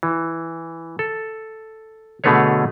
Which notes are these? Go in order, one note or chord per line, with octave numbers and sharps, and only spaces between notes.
E3
A4
B2 D3 A3 G#4 B4 C#5